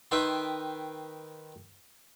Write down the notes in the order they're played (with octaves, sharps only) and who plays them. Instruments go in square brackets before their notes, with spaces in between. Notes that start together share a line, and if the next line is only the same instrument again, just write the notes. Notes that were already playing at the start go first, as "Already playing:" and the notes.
[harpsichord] D#3 B4 E5 G5 C6